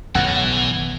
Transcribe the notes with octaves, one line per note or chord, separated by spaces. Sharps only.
B1 F#2 A2 E3 E4 F#5